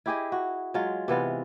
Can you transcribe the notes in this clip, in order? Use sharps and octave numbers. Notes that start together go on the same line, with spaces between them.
E4 G4 G#4 D#5
F#4
F#3 G#3 F4
C3 E3 B3 F4